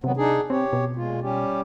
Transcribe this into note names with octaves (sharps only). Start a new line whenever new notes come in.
C3 D#3 F#3 B3
D4 D#4 G#4
C4 G4 C#5
B2
A#2 G#3 F4
G3 C#4 G4